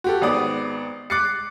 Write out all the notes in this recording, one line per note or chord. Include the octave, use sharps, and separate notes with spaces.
F#4 G4 A4
G#1 B3 D5 D#6
D6 F#6 A6 C7 C#7